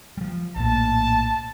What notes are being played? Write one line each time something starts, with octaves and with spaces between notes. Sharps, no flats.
F3 G3
A#1 A2 A#3 A5